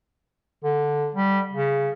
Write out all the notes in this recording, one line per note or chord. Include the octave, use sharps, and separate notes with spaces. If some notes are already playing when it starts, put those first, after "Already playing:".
D3
G3
C#3